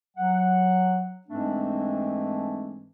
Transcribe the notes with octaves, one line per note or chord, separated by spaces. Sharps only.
F#3 F#5
G#2 E3 G#3 A3 C4 D4